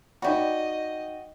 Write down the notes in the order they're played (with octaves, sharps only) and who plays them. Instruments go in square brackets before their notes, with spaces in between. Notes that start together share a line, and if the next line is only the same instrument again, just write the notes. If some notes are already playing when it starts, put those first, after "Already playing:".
[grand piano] D#4 D5 B5 [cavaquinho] F#4 G5 [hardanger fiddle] D#5